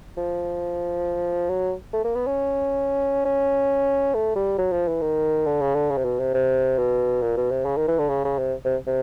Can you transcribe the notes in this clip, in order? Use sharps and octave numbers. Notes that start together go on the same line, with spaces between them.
F3
F#3
A3
A#3
B3
C#4
C#4
A3
G3
F#3
F3
E3
D#3
D3
C#3
D3
C#3
C3
B2
C3
C3
B2
A#2
B2
C3
C#3
D#3
E3
D3
C#3
C#3
C3
C3
C3